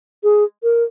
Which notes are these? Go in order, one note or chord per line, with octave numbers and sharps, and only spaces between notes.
G#4
A#4